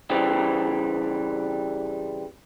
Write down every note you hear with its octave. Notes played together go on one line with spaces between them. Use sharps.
C#3 E3 G3 C4